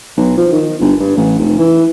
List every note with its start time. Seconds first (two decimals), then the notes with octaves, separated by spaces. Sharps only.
0.17 B1
0.37 F3
0.52 D#3
0.81 G1
1.00 G2
1.17 A1
1.39 F1
1.58 E3